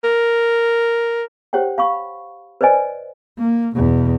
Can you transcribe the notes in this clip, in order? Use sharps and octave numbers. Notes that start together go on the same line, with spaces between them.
A#4
G4 C5 C#5 F#5 G5
F5 B5 C#6
B4 C5 D5 D#5 G#5
A#3
E2 B2